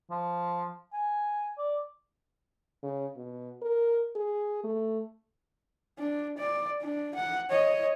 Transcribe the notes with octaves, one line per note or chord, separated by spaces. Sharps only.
F3
G#5
D5
C#3
B2
A#4
G#4
A3
D4
D5
D4
F#5
C#5 D#5